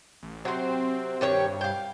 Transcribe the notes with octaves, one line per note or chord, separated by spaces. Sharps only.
A1
C3 F#3 C4 C5
G2 D#3 G4 C#5
F5 G5